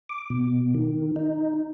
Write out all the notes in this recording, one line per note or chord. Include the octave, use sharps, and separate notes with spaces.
D6
B2
D#3
D#4